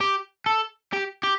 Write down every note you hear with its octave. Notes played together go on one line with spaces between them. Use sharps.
G4
A4
G4
G4